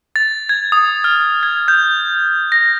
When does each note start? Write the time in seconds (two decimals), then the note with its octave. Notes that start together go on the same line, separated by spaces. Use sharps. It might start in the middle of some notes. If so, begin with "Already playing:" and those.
0.16 A6
0.49 G#6
0.72 D#6
1.04 F6
1.43 G#6
1.68 G6
2.52 A#6